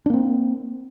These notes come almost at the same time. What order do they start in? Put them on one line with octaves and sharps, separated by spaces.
D4 A#3 C4